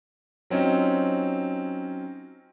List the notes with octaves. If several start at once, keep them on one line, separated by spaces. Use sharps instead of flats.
F#3 C4 C#4 D#4 F4